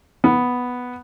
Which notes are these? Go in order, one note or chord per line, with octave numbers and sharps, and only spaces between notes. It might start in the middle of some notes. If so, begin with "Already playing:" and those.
B3